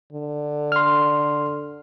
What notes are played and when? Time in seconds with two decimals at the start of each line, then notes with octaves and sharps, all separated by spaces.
0.13 D3
0.72 C6 F6